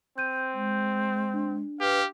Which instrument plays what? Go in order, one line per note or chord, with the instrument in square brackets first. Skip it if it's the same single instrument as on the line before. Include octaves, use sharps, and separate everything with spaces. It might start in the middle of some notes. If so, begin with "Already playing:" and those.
[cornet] C4 [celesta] G6 D#7
[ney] G#3
[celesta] D4
[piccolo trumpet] G4 [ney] B4 [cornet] F5